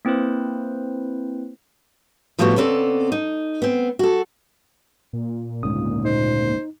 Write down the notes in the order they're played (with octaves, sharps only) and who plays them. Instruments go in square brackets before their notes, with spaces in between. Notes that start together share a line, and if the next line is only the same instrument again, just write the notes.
[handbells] A#3 C4 E4 B4 C5
[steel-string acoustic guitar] A2 F3 G3 A3 B3 F#4
C#3 B3 C4 A4 D5
D#4
B3 C4
F#4 A4
[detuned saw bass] A#2
[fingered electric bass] D2 G#2 C#3 [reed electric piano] D#6
[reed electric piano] D#4 [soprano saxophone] C5